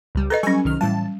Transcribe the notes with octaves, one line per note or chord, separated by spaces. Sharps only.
C#2 G3
A4 B4 D#5 A#5
F#3 G3 C#4 G#5 C#6
C2 D#3 F6
A2 E3 G3 A5